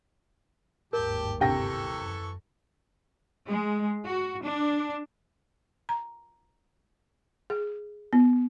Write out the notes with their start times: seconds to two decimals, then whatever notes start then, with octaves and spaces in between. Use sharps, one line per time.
0.93 G1 D#2 G#2 G4 A#4 G5 A5
1.40 C3 E3 A4 G5 C#6 A#6
1.93 F#2
3.47 G#3
4.06 F#4
4.44 D4
5.89 A#5
7.50 G#4
8.13 B3